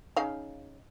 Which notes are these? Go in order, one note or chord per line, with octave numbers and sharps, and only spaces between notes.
C#3 D#4 F5